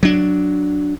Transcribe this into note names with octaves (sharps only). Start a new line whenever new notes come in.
F#3 D4